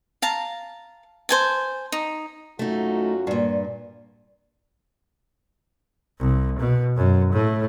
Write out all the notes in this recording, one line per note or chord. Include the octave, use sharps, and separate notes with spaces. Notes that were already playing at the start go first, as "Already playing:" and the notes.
F5 A5 A#5
C5 G#5 A5
D#4
F#2 A3 D#4 F4 F#4
G2 A#2
C2
B2
F#2
A2